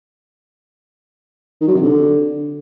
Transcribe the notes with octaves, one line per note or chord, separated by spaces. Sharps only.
D#3
F#3
C3
D3